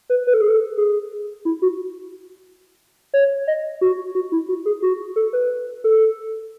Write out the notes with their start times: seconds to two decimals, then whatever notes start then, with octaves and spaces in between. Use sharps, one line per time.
0.10 B4
0.27 B4
0.34 A4
0.41 G#4
0.48 A4
0.77 G#4
1.45 E4
1.62 F#4
3.14 C#5
3.48 D#5
3.81 F#4
4.15 F#4
4.32 E4
4.49 F#4
4.66 G#4
4.82 F#4
5.16 A4
5.33 B4
5.84 A4